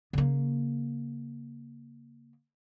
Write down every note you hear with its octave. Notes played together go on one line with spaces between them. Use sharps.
C#3 A#3